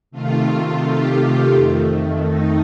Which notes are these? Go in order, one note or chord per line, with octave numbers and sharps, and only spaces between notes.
C3 D#3 A3 F4
G4
F2 D#3 A3
D#4